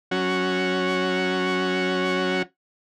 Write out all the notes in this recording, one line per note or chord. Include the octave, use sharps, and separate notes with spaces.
F#3 C#4 F#4